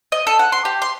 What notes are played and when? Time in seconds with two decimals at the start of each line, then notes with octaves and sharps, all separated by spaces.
0.12 D#5
0.27 A4
0.39 F#5
0.52 C6
0.65 G4
0.82 C6